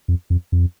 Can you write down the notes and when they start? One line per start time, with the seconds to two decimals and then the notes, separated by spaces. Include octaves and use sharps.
0.08 F2
0.30 F2
0.52 F2